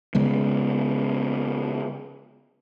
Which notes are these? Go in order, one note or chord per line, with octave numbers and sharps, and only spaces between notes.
C#3 G#3 B3